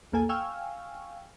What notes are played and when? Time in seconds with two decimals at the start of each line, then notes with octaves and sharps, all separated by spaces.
0.12 A#1 E2 A#3 A4 G#5
0.29 F5 G5 G#5 C#6 E6 F6